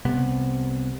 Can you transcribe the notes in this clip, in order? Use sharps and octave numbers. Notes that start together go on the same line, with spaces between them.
C2 C3 B3